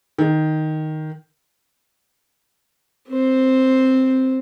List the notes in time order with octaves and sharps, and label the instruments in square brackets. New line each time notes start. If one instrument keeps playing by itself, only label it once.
[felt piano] D#3
[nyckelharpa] C4 C5